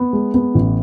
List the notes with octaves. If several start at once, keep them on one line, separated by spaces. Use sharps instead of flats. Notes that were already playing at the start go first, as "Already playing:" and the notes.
Already playing: B3
G#3
B3
A1